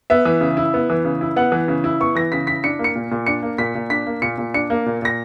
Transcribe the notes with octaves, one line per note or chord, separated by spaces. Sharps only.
B3 E5
E3
C#3
E4
B3
E3
C#3
E4
B3 F#5
E3
C#3
E4
B3 C#6
E3 A#6
C#3 B6
E4 B6
D4 C#7
A#3
C#7
A#2
A#2
D4 C#7
A#3
A#2 B6
A#2
D4 B6
A#3
A#2 C#7
A#2
D4 C#7
A#3
A#2
A#2 A#6